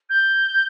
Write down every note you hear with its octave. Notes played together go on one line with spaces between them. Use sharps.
G6